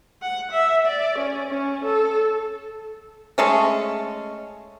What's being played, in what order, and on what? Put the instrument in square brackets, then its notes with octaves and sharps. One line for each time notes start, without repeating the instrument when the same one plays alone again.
[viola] F#5
E5
D5
C#4
C#4
A4
[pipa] G#3 A3 C#4